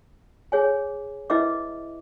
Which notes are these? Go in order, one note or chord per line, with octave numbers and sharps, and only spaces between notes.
G#4 C#5 G#5
E4 B4 D#5 E5 D6